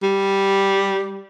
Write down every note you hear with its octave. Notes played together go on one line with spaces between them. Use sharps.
G3